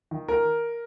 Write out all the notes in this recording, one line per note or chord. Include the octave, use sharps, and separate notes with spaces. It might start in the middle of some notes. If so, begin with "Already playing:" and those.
D#3
A#4